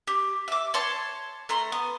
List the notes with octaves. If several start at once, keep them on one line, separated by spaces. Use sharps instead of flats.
G4
E5 D6
C#5 A5 C6
A3 A#5 C6
B3